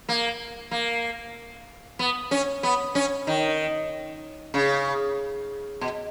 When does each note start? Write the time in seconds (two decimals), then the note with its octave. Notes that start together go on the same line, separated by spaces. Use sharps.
0.09 A#3
0.71 A#3
1.99 B3
2.31 C#4
2.63 B3
2.95 C#4
3.27 D#3
4.54 C#3
5.81 B2